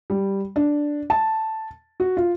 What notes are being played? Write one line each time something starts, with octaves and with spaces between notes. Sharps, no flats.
G3
D4
A5
F#4
F4